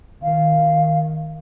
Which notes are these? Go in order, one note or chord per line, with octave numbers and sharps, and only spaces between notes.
D#3 F5